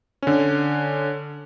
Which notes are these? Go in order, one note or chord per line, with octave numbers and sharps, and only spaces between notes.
D3 C#4